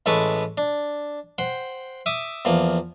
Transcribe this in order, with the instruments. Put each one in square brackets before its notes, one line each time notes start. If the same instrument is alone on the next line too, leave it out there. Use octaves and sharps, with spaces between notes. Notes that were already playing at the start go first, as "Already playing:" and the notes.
[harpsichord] A1 G#3 A4 B4 C#6 D6
D4
C5 F#5 G5
E5 D6 D#6
E2 F3 A#3